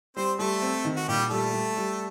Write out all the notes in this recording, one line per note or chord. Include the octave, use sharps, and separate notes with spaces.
G3 C4 C5
G3 A3 A4
C4
D#3
F#4
A#2 G3 G4
G3 A3 A4
G3
G3